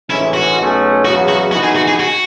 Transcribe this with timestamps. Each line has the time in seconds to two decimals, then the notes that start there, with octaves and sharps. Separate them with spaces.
0.10 A1 G#2 E3 G#3 C#4 E4
0.34 F#4
0.58 B1 B2 A3 C#4 G#4
1.05 E2 C#3 F#3 F#4
1.28 F#4
1.52 G#1 G#2 E3 B3 D#4 F#4
1.64 G#4
1.76 F#4
1.88 G#4
2.00 F#4